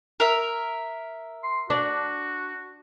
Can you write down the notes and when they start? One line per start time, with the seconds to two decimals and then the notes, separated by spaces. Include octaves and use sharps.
0.20 A#4 E5
1.43 C6
1.70 D4 F#4